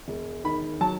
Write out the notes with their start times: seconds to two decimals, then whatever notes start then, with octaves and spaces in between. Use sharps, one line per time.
0.08 E1
0.44 D#3 B5
0.81 F#3 A5